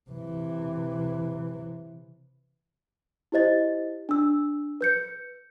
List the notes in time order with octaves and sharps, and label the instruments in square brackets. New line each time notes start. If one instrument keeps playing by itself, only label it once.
[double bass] C3 E3
[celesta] E4 G4 C5 D#5 A6
D4 E6
B4 G6 C#7